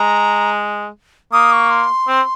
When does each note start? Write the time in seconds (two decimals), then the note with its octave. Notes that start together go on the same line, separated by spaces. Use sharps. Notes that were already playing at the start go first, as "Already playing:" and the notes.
Already playing: G#3 A#5
1.33 A#3 D#6
1.52 C#6
1.71 C6
2.08 C4